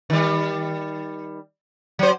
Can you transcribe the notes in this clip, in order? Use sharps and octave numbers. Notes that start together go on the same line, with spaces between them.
D#3 G3
F#3 C5